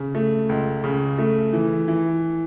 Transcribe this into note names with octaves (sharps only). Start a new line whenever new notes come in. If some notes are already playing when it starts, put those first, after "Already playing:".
Already playing: C#3
A3
C#2
C#3
A3
E3
E3